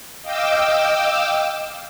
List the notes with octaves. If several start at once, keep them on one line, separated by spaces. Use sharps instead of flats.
D#5 F5 G5 D6 E6